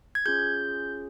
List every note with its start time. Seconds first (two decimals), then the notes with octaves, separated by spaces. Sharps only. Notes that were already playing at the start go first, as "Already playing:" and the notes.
0.15 G#6
0.26 C#4 F4 G#4 G6